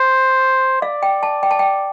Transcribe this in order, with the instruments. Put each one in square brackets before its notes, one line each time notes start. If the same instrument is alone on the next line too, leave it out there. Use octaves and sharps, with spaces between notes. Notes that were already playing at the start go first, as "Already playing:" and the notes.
Already playing: [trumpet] C5
[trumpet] D5 [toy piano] F5
[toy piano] G5
A5
G5
A5
G5